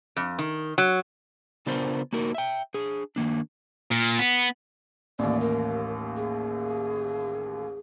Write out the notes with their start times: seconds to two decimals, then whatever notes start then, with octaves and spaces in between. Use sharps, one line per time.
0.16 F2
0.39 D#3
0.78 F#3
1.66 C#3 B3 D4 F4 A#4 C5
2.13 A#3 D#4 F#4 A#4
2.34 E5 G5
2.74 D4 G#4
3.16 D#3 A#3 D4
3.91 A#2
4.19 B3
5.19 A1 D#2 D5
5.41 A#4
6.16 G#4